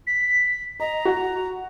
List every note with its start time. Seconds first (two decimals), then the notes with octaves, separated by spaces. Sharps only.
0.07 B6
0.80 D#5 A#5
1.05 F#4